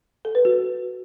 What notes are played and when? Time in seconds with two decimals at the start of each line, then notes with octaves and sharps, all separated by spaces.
0.25 A4
0.35 B4
0.45 F#4